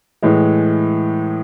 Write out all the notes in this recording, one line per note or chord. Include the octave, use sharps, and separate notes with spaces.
A2 E3 G#3